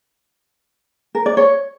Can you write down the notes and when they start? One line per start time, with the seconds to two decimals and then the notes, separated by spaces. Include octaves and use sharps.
1.15 A#4
1.26 D5
1.37 C#5